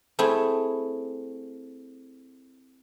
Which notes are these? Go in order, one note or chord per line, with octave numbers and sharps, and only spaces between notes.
A3 C4 E4 G#4